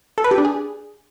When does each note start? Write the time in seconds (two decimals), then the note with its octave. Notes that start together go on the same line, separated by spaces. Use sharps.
0.18 A4
0.24 B4
0.31 G4
0.38 D4
0.45 G#4